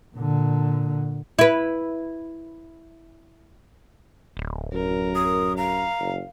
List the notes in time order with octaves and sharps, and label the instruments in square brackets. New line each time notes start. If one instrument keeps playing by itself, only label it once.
[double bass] A#2 D3
[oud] E4 B4
[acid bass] D1
[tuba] F#2 [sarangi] A#4
[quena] D#6
[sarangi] F5 [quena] A#5
[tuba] F#1